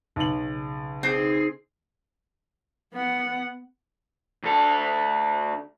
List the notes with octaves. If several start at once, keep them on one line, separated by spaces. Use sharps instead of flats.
B1 C#3 F#7
C4 D#4 G#4
B3 F#5
D2 A4